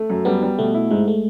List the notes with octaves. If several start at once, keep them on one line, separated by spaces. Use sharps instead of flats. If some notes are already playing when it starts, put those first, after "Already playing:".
Already playing: A3
F#2
G3 B3
G3
B2 A3
E4
G#2 G#3
A3